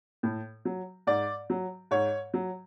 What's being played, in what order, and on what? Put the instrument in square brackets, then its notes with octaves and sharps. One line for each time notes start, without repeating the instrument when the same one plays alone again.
[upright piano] A2
F#3
G#2 D5
F#3
G#2 C#5
F#3